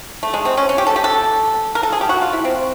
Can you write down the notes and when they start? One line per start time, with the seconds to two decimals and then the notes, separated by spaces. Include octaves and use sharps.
0.23 A3
0.34 G#3
0.45 C4
0.57 C#4
0.69 C#4
0.78 G4
0.87 A4
0.96 G4
1.04 A4
1.75 A#4
1.83 A4
1.92 G#4
2.01 G4
2.09 F#4
2.22 F4
2.33 E4
2.45 C4